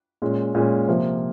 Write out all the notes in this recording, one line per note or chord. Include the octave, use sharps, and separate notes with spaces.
A#2 G#3 C#4
A#2 G#3 C#4
C3 F3 A#3